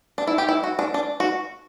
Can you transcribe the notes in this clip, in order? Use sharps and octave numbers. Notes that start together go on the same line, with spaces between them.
D4
E4
G4
E4
F#4
D4
D4
F#4